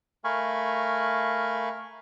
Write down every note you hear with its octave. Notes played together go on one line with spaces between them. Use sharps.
A3 A#4 F5 G#5 B5 C#6